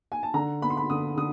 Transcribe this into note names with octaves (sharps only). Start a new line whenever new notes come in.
G#5
A5
D3 A#5
B3 B5
C6
B5
D3 D#6
D3 D#6